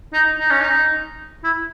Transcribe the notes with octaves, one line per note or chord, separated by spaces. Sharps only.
D#4
D#4
C#4
D#4
E4